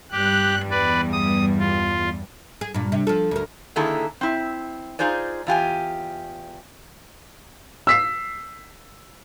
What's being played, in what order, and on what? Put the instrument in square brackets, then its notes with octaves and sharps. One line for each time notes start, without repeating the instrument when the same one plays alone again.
[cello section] G2 G3 [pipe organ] G4 [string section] F#6
[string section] E2 [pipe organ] B4 D5
[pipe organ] D#6
F4
[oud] G#4
G2 A#2
C3
F3 A4
D2 A#4
[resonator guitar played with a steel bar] D3 D#3 A#3 E4 G#4 A4
C4 E4
D#4 F4 G#4 C5 D5
E2 F4 G4 G#5
[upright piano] E6 B6 C7